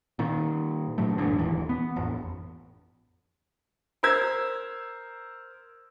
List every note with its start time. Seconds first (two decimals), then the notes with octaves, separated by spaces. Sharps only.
0.19 A#2 D#3
0.98 A#2 F#3 A3
1.18 G1 E2 G#2 D3
1.39 D#1 D#2 E3
1.69 B3
1.96 A1 F2
4.03 A#4 C5 E6 G#6